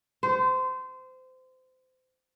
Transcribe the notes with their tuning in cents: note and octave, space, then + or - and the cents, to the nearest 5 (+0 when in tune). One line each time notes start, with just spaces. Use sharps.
C5 -25